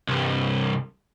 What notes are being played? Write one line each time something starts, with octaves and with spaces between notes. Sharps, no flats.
C2 G2